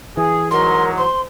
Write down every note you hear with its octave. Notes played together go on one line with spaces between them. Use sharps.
E3 G#4
G#2 F#3 A#4 C6
C5 C6